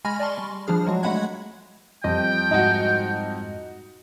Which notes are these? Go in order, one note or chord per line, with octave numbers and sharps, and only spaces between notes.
G#3 G#5 B5 C#6 F6 A#6
D5 G#5 A5 C6 C#6
G3
F3 G3 D4 G#4 F6
F#3 G#3 F#4
G#3 A3 F#5 B5 F#6 G#6
F2 G3 D#5 G5
G#2 D#4 F#4